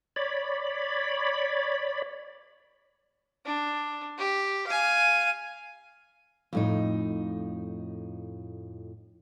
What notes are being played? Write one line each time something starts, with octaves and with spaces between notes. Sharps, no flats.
C#5 D5 B5
D4
G4
F5 G#5
F2 A2 D#4